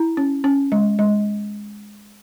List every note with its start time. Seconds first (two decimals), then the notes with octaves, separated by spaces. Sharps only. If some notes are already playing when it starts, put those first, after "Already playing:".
Already playing: E4
0.17 C#4
0.44 C#4
0.72 G#3
0.99 G#3